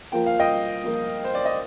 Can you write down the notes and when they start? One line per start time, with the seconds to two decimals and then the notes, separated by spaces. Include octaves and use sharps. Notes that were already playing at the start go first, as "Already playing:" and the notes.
0.12 F3 A#3 F4 A#4 G5
0.26 F5
0.40 D#5 G5
0.83 F3 A#3 F4 A#4
1.24 C5
1.35 D5
1.45 D#5